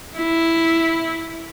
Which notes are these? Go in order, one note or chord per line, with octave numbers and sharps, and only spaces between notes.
E4